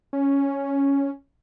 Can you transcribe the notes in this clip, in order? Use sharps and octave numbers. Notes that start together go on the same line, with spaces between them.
C#4